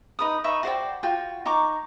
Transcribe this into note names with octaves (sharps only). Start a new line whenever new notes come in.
D#4 B4 D#6
D#4 B4 E5 C#6
F#4 C5 D5 G5
F4 F#4 G5
D#4 A#5 C#6 D6